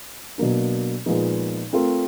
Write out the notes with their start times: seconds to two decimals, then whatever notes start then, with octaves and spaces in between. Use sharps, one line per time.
0.38 B2 F#3 A#3 D4
1.06 A#2 F3 G#3 B3 D#4
1.73 A3 C4 F4 A#4